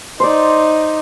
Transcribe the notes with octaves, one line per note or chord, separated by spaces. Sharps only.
D#4 C5 D5